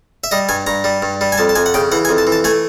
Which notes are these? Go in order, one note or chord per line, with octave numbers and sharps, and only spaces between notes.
E5
G3 D#5
G2 G#5
G2 A#5
G3
G2
G3
G#5
F2 A5
A5
F2 G#5
F#5
C#3 G5
E3 F#5
G#5
F2
A5
E3
A5
A3 G#5